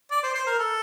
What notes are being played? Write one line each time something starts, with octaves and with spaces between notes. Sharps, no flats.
D5
C5
C5
A#4
A4